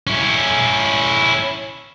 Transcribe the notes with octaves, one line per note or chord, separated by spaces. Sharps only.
C#4 E4